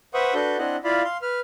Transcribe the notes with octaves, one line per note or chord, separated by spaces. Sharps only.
B4 C5 E5 F#5 C#6 D#6
D4 F#4 A4 B4 G6
C4 D4 E4 D#5 F#5
E4 F4 D5 F5 B5
F5 C6
B4 F6